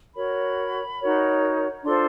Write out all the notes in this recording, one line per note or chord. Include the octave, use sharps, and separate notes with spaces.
F#4 A#4 C#5 B5
D#4 F#4 A#4 C#5
D4 F4 A4 C5 C6